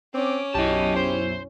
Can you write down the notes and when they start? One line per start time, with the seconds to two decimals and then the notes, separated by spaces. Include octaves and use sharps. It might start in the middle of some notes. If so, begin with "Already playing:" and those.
0.15 C4 C#4 D6
0.54 B1 F#2 E4 G4 D#5 A5
0.96 C5